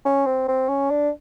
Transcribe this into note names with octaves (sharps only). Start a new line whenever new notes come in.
C#4
C4
C4
C#4
D4